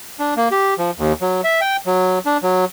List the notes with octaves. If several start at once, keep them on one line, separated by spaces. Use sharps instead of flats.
D4
A#3
G4
F3
D#2
F#3
E5
G5
F#3
D4
F#3